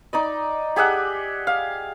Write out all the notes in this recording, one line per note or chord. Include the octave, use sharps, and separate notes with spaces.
D#4 D5 D#5
G4 G#4 E5 F#5
F5